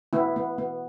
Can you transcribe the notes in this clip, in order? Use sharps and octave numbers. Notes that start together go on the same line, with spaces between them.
B3 E4
B3
B3